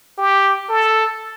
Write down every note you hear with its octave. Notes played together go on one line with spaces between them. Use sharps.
G4
A4